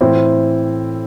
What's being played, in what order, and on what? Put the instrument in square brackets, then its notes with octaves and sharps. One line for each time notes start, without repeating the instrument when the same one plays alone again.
[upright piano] A2 E3 C4 E4